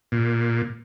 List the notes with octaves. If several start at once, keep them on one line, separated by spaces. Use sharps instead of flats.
A#2